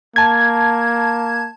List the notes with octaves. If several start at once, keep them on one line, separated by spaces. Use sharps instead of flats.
A#3 A5 G#6